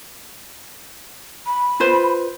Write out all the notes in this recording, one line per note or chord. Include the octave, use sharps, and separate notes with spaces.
B5
F4 B4 C5